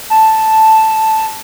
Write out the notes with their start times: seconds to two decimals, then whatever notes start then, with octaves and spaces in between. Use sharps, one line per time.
0.10 A5